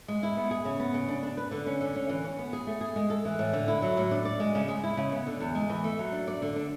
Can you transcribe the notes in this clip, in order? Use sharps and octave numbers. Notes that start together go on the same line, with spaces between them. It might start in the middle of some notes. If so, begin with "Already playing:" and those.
G#3
E4
B3
G#4
C#3
B3
C#3
D4
D4
B4
D3
C#4
D3
C#4
E3
C#4
B3
G#4
A3
G#4
G#3
A4
E3
A2
D3
E4
F#3
A2
D4
D5
G#3
C#3
G#3
E4
C#3
B3
D3
E2
G#3
E3
A3
F#3
D4
D5
D3
D4